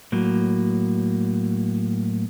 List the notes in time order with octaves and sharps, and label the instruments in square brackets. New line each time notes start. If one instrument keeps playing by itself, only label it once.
[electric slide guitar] A2 F#3 A#3